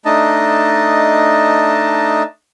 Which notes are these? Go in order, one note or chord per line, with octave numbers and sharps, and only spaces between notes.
A3 D4 D#4 D#5 A5